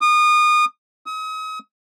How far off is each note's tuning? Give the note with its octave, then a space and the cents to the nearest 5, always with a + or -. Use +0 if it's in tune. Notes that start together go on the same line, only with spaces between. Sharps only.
D#6 -30
D#6 +40